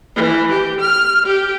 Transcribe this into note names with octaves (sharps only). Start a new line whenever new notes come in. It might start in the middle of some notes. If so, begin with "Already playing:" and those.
E3
G4
F6
G4